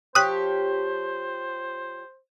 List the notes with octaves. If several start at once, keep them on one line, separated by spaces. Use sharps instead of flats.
F3 G4 C5 C#5 D#6 F#6